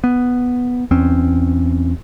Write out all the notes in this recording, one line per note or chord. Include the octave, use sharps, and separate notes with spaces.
B3
E2 C4 C#4